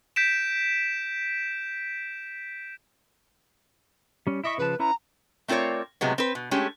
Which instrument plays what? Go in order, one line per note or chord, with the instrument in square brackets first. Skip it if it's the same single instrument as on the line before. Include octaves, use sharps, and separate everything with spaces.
[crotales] G6 B6 D7 E7
[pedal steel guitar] G3 C#4
[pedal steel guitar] E4 D#5 C#6 [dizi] E5
[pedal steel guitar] C#3 F3 A5 [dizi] B4
[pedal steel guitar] C#4 E4 B4 [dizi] A#5
[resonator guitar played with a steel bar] A3 C4 F4 A#4 C#5 D5
A2 C3 F#3 G#3 B3
C4 B4
B2
G#3 A3 C#4 G4